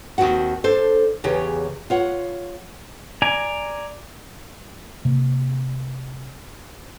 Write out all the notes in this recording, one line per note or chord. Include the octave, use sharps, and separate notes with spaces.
D#2 G#2 C4 F#4 F#5
D4 A4 C5
E2 C#3 G4 C#5
F4 C#5 F#5
D5 G#5 A#5
C3 A#3